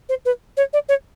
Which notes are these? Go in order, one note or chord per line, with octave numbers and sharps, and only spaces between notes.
C5
B4
C#5
D5
C#5